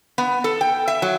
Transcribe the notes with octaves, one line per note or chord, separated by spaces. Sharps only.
B3
A4
G5
E5
F#3